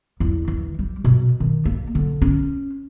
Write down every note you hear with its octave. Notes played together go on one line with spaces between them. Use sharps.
E2
E3
G3
B2
D#3
A#3
D3
C#4